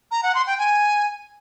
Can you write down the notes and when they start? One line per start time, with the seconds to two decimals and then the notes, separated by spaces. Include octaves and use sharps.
0.11 A#5
0.23 F#5
0.35 C6
0.47 G5
0.58 G#5